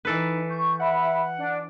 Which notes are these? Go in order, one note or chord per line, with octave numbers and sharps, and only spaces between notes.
E3 D#4 A4 B4
C#6 G6
E5 F#5 B5
D4